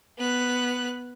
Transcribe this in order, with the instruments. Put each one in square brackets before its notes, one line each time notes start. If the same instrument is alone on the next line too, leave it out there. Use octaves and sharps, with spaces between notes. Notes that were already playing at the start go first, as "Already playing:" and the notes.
[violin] B3 F#6